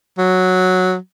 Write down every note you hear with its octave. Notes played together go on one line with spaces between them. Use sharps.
F#3